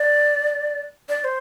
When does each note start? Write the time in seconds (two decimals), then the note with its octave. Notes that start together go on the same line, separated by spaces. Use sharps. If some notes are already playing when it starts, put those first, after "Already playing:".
Already playing: D5
1.09 D5
1.21 D5
1.24 C5